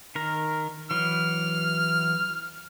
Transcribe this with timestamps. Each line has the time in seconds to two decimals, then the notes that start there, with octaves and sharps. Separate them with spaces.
0.15 D#3 A#4
0.91 E3 F#3 F6